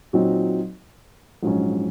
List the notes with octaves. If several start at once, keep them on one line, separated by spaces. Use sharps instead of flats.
A#2 F#3 C4 D#4 F#4
A#1 G#2 F#3 C#4